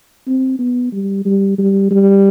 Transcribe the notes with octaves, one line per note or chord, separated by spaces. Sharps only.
C4
B3
G3
G3
G3
G3